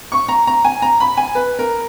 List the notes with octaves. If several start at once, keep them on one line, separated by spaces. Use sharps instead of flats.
C#6
A#5
A#5
G#5
A#5
B5
G#5
B4
A#4